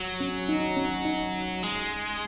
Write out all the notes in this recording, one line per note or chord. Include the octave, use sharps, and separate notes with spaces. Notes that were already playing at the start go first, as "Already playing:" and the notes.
Already playing: F#3
C#4
D#4
C#4
D#4
G#3